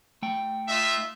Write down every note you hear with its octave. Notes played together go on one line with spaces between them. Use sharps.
A3 G5
D#4 F4 E5